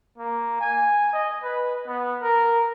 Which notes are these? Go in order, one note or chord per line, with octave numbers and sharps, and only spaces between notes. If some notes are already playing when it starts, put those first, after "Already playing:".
A#3
G#5
D#5
B4
B3
A#4